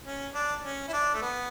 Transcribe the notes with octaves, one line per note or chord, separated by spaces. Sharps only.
C#4
D4
C#4
E4
D4
A3
B3